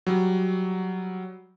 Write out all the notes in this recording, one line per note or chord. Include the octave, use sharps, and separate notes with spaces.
F#3 G3